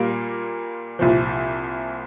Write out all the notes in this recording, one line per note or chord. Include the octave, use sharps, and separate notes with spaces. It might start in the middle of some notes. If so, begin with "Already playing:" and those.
Already playing: A#2 G3 A#3 F4 A#4
C2 A#2 F3